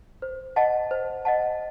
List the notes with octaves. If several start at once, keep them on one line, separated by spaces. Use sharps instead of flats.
C5
D#5 F#5 A5
C5
D#5 F#5 A5